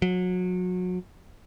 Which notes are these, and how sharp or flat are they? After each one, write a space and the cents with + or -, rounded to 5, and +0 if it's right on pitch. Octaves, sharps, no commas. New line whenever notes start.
F#3 -30